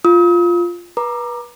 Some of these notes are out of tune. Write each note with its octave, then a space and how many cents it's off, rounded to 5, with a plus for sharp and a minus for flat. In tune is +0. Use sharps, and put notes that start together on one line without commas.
F4 +0 D#6 +45
B4 -30 A#5 +5 D6 +20